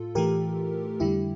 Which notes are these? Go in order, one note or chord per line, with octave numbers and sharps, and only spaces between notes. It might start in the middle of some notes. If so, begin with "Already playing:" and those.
Already playing: A2 F4 A4
A2 E3 A3 G4 A#4
F2 D3 G3 E4 G4